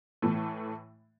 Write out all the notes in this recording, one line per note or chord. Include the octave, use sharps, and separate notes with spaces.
A2 E3 A3